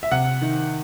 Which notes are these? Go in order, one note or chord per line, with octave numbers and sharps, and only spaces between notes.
E5
C3 F#5
D#3